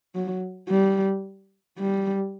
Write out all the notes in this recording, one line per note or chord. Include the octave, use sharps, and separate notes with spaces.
F#3
G3
G3